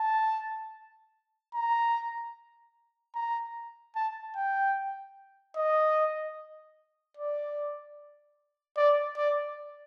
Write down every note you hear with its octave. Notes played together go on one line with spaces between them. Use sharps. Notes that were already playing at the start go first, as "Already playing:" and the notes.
Already playing: A5
A#5
A#5
A5
G5
D#5
D5
D5
D5